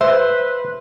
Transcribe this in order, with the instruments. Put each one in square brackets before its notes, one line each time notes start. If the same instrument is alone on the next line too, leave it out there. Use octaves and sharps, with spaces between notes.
[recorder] B4 [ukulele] C5 [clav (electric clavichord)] E5